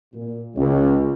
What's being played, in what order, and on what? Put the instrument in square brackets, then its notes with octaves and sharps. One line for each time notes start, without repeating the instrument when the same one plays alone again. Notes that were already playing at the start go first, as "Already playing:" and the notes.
[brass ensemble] A#2
C#2